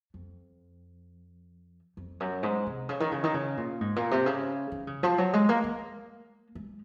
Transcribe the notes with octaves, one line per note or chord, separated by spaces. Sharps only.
F2
F2
F#2
G#2
C3
C#3
D#3
C#3
D#3
C#3
A#2
G#2
A#2
C3
C#3
D#3
C#3
F3
F#3
G#3
A#3
A#3
G#3